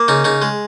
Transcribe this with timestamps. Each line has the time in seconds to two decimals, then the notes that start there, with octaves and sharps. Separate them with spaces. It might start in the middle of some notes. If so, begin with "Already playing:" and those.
Already playing: A#3
0.08 C#3 D#4
0.25 C#3 D#4
0.42 G#3